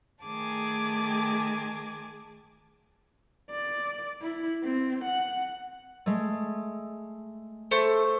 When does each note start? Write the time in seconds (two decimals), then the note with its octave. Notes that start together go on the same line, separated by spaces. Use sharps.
0.24 D#3 A3 G#4 G#5 A5 D6
3.50 D5
4.21 E4
4.63 C4
5.04 F#5
6.06 G#3 A3
7.71 A3 C5